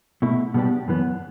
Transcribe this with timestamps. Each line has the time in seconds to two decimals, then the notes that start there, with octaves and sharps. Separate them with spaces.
0.22 B2 A3 E4
0.54 B2 G3 B3 D4 G4
0.88 F#2 E3 B3